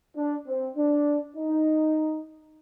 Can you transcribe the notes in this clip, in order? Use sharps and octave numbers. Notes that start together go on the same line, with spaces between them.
D4
C4
D4
D#4